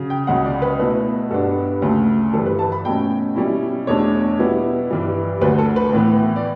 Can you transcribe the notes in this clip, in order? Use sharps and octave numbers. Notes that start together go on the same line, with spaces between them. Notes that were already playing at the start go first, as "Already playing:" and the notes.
Already playing: C#3 F#3
G5
C#2 C#3 F#3 F#5
D5
B4
B2 A3 E4 B4
G2 F#3 B3 D4 A4
D2 C#3 F#3 A3
G2 E3 G3 A4
B4
A5
B5
B2 F#3 A3 C#4 G5
B2 G3 C#4 E4
E2 B2 A3 D4 C#5
B2 G3 B3 E4
G2 E3 G3
D2 D3 F#3 B4
A4
B4
A2 E3 B3
D5